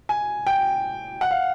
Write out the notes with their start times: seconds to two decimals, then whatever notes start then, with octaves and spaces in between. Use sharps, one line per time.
0.09 G#5
0.47 G5
1.21 F#5
1.31 F5